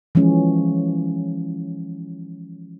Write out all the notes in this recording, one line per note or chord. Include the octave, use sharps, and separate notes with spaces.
E3 F3 G#3 C#4